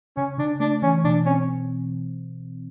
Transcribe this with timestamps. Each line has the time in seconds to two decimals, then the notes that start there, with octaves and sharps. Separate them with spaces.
0.17 C#3 C#4
0.38 C#3 D4
0.60 A3 D4
0.82 E3 C#4
1.04 B2 D4
1.26 C4 C#4